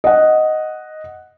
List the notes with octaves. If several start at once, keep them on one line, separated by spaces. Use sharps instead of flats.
D#5 F#5